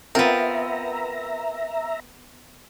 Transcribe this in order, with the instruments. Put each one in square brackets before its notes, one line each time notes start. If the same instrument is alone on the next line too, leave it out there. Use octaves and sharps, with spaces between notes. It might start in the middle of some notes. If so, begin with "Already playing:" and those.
[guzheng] B3 A#4 [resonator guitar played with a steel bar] C4 F4 [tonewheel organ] E5 A#5